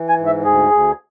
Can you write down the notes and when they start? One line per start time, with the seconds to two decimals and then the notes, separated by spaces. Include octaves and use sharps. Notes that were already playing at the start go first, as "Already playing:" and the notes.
Already playing: E3
0.09 G#5
0.18 G#2
0.26 E5
0.44 D2 G#4
0.71 D2